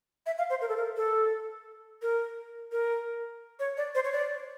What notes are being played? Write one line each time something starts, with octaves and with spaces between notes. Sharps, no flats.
E5
F5
C5
A#4
A4
A#4
A4
A#4
A#4
C#5
D5
C5
C#5
D5